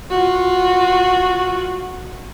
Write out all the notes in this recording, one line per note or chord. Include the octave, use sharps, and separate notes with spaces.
F4 F#4